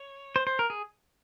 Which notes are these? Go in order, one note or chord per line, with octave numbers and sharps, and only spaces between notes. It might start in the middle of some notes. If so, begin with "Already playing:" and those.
Already playing: C#5
C5
C5
A#4
G#4